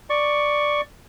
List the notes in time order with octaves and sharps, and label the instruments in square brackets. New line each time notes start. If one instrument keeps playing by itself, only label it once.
[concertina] D5 C#6